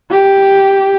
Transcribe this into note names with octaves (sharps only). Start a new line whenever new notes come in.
G4